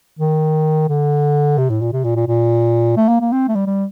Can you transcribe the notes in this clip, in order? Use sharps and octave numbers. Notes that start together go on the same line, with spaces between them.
D#3
D3
C3
A2
A#2
C3
A#2
A#2
A#2
A3
A#3
A#3
C4
A3
G3
G3